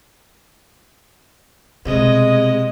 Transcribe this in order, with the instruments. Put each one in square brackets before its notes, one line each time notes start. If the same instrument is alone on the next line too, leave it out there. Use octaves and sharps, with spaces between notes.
[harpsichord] C2 [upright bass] B2 [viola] G#3 [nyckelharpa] D#5